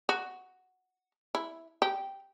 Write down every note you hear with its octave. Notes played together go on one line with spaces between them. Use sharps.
F#4
E4
G4